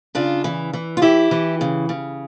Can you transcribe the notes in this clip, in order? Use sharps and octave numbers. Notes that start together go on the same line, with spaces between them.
C#3 D4 F4
E3
E3
F4
E3 E4 G4
E3
C#3
C#3